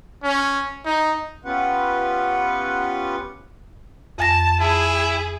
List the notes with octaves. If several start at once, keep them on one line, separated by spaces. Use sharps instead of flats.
C#4
D#4
B3 C#4 F4 G4 B4 F#5
F2 G#5 A5 A#6
E4 G#4 A5